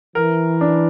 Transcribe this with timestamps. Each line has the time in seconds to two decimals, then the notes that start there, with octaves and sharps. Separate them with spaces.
0.15 E3 A#4
0.61 D4